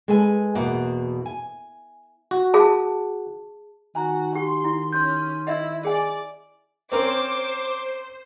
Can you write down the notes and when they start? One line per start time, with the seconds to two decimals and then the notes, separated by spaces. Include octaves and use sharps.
0.08 G#3 A4 B4 G#5
0.55 E2 B2 A#3 F#5
1.26 G#5
2.31 F#4
2.54 G#4 A5
3.95 D#3 F#4 G#5 A#5
4.35 G4 C6
4.64 E4
4.93 C#4 C6 G6
5.47 E4 D#5 E5
5.85 G#4 D5 G#5
6.92 C4 C#4 A#4 C5 D6